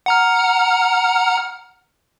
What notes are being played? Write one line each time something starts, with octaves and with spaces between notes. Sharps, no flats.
F#5 A#5 F6